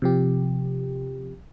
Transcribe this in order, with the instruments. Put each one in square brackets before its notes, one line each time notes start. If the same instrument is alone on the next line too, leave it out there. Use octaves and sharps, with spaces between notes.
[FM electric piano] C3 F3 G4